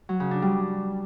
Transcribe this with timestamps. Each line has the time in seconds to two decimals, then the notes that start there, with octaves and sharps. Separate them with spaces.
0.09 F#3
0.20 C#3
0.31 D4
0.42 G3